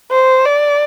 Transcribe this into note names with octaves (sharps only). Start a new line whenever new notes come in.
C5
D5